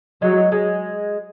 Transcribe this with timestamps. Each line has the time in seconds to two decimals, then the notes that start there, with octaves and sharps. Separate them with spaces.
0.22 F#3 G#3
0.52 G#3